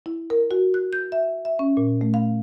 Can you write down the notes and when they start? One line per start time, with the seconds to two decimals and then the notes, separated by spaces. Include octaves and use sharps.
0.06 E4
0.30 A#4
0.51 F#4
0.74 F#6
0.93 G6
1.12 E5
1.45 E5
1.59 C#4
1.77 A#2
2.01 A3
2.14 F5